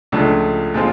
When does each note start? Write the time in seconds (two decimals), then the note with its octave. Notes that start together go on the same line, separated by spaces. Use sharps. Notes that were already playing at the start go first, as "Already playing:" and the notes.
0.12 C#2 C#3 F3 A3 D4
0.74 A#2 F3 G#3 C4 F4